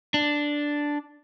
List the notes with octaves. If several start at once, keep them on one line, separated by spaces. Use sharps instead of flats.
D4